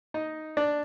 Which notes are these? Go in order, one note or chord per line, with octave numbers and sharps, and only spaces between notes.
D#4 D#5
D4 D5